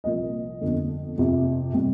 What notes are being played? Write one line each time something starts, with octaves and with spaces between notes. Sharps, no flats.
C2 A#2 F3 A#3 D#5
G1 F2 D3
F2 C3 F3
C3 G3